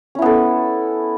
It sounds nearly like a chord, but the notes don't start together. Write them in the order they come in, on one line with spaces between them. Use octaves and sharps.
C#4 E4 B3 A4